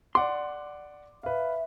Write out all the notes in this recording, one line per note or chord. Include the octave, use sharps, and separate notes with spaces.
D5 F#5 C6 D6
B4 E5 F5